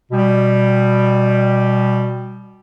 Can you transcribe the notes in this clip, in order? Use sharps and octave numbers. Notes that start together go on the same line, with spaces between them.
B2 G3